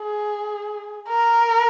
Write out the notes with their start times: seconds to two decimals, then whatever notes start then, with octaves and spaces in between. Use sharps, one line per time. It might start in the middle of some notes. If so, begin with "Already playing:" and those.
Already playing: G#4
1.09 A#4